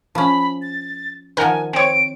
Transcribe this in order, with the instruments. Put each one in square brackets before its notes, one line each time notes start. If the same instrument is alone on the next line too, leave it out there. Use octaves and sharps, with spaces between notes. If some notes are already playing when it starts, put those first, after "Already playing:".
[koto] F3 C#4 [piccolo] B5
[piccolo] A6
[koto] D#3 F3 [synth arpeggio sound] A#4 F#5 [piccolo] G#5
[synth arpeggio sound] C4 C#5 [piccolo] D7